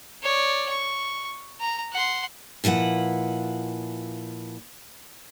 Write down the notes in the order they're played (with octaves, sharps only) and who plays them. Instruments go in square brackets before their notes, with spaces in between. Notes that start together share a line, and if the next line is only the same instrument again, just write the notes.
[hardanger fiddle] C#5 D5
C#6
A#5
F#5 C6
[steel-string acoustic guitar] A#2 F3 E4 B4 F#5